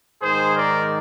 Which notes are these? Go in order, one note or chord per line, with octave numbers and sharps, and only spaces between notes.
G#2 D#3 G#4 C5
A#4 D5